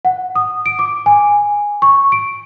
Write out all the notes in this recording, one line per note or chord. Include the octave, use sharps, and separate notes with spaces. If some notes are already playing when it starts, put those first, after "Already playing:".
F#5
D#6
D7
D6
G#5
C#6
D7